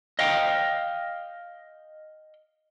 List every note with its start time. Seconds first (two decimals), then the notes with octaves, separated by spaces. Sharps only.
0.19 D#5 F5 G5